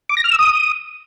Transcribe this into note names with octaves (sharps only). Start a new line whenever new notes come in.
D6
A#6
F6
E6
D#6